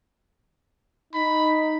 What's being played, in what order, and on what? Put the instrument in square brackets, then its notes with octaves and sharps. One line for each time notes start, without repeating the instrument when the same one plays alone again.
[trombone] D#4 [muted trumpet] B5